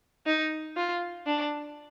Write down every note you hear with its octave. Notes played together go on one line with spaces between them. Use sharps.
D#4
F4
D4